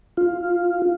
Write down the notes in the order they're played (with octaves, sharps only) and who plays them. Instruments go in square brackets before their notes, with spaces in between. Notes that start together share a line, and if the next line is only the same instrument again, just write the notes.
[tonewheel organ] F4